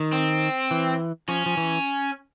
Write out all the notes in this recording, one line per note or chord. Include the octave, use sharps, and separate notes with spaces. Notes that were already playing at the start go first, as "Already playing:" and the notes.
Already playing: D#3
C4
E3
F3 C#4
F3
E3